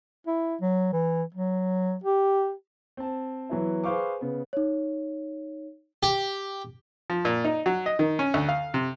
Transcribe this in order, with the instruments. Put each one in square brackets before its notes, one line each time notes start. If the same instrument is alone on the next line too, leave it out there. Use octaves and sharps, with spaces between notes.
[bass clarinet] E4
F#3
E3
F#3
G4
[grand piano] C4 A5
E3 F#3 B3 E4
G#4 B4 C5 F5 C#6 D6
C#3 B3
[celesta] D#4 C#5
[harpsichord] G4
[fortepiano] F3
A#2
D#4
F#3
D#5
D#3
C#4
D2
F5
C3